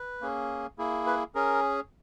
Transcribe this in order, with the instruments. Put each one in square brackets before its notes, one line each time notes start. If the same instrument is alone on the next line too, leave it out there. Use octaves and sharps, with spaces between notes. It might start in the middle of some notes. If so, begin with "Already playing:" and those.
Already playing: [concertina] B4
A#3 C#4 G#4
A#3 E4 G#4
B4
C#4 G#4 A#4